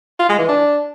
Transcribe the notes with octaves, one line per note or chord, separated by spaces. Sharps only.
F4
G#3
E3
D4